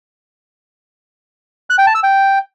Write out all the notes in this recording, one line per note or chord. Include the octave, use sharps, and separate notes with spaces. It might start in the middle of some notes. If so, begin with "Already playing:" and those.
F#6
G5
A5
E6
G5